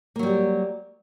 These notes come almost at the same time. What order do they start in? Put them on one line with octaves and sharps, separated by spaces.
A#3 F#3 G3